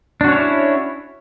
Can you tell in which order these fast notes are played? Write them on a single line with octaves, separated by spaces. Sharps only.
D4 F#4 C#4 C#5 E4